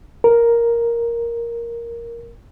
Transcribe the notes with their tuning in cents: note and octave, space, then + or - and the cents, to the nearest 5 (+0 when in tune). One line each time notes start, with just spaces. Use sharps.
A#4 +5